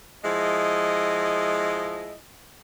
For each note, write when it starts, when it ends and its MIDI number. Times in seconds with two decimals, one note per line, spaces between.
0.24 2.13 53
0.24 2.13 56
0.24 2.13 64
0.24 2.13 75